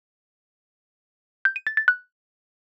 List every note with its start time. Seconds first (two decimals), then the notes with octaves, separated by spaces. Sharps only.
1.45 G6
1.56 D#7
1.67 A6
1.77 A6
1.88 F#6